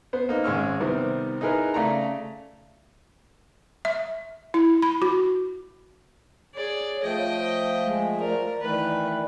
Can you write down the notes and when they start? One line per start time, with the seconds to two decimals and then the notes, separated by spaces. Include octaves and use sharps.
0.13 B3 C5
0.29 A#3 D#4
0.44 G#1 G#3 C#4 C#6 E6 F6
0.80 C3 D#3 G3 B3 C4
1.41 D#4 E4 G#4 A#4 B4
1.74 C#3 A3 D5 A#5
3.85 E5
4.54 E4
4.82 B5
5.02 F#4
6.55 G#4 C#5 D5
7.03 F3 A3 D#5 G5
7.84 G#3
8.20 A#4 D5
8.62 D#3 E3 A3 B4